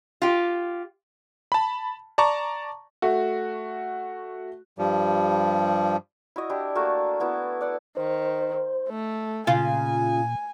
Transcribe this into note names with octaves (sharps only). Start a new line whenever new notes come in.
F4 G4
A5 B5
D5 A5 A#5 C#6
A3 F#4
G2 F3 G3
E4 F#4 D#5
D4 E4 G4
A3 A#3 F#4 A4
B3 E4 F#4
D5 F#5 D6
D#3 C5
A3
A#2 C#3 F4 G#5